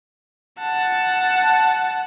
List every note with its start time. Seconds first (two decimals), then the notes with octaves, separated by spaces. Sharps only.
0.59 F#5 A5